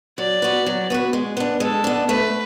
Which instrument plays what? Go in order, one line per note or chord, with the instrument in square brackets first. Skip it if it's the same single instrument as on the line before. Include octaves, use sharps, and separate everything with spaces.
[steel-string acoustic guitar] F#3 [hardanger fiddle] D5
[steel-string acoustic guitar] B3 F#4 B4
F#3
B3 F#4 B4
G#3
B3 D4
[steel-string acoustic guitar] G#3 [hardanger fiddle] A4
[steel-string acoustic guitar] B3 D4
[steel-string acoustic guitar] A3 [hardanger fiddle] B4